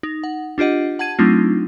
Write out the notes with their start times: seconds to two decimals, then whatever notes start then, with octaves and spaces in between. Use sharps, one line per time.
0.03 D#4
0.24 F#5
0.58 D4 F4 G4 D#5 F#5
0.99 F#5 A5 G#6 D#7
1.19 F#3 A3 C4 D4 D#4 F4